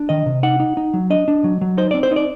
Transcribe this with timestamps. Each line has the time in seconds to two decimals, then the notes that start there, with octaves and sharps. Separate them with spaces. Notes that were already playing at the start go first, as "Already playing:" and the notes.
Already playing: D4
0.09 D#3 D#5
0.26 C3
0.43 D#4 F#5
0.60 D#4
0.77 D#4
0.94 F#3
1.10 D4 D#5
1.28 D4
1.44 F#3
1.61 F#3
1.77 D#4 C5
1.91 C4 D5
2.03 C5
2.11 D#4
2.16 D5